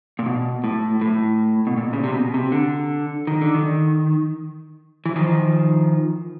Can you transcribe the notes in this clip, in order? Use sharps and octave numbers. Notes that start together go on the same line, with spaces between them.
A#2
B2
A2
A2
B2
A#2
C#3
C3
B2
C3
D3
D#3
D3
D#3
E3
D#3 F3